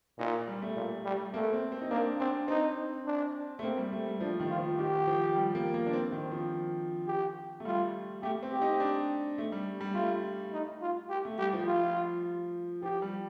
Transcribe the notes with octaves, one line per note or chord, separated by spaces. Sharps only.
A#2 D#4
G3
A3
A#2
G3
A3 A#3
C4
C4
D#4
A#3 D4
C4 D4
C4 D#4
D4
A3
A#3 C4
G3
A3
G3
F3 D4
D#3
F4
F3
D#3 G4
F3
G3
A#3
A#3
D4
C4
D#3
F3
G4
A3
G3 F4
A3 G4
C4
G4
D#4
D4
A3
G3
G3
A3 F4
D#4
F4
G4
A3
G3 G4
F3
F4
F3 G4
G3